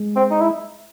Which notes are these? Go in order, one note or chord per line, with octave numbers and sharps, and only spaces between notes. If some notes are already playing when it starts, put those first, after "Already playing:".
Already playing: G#3
C4
D#4
E4